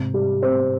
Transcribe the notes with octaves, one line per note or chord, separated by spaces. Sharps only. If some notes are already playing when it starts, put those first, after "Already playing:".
Already playing: G#2 C3
G3
C4